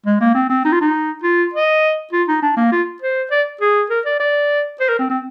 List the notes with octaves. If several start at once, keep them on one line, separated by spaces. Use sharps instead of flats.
G#3
A#3
C4
C4
D#4
F4
D#4
F4
D#5
F4
D#4
D4
A#3
F4
C5
D5
G#4
A#4
D5
D5
C5
A#4
C4
C4